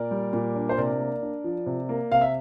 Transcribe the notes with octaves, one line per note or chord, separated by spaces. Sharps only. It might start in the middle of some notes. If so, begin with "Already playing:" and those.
Already playing: A#2 A#4 D5
G3
A#2
D4
C5
C3 A#4 D5
A#3
D4
F3
C3
A#3
C3 F5
E5